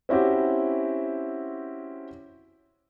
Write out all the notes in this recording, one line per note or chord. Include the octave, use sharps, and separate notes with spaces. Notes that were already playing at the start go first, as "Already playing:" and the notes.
C4 C#4 E4 F#4 G4